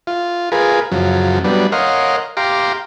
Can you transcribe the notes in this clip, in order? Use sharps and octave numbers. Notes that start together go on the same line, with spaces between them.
F4
F4 G#4 A#4 B4
F#2 C#3 F3 F#3
F#3 G3 B3 D4
A#4 C#5 D#5 F5 F#5 C6
G4 F5 A#5 C6 D6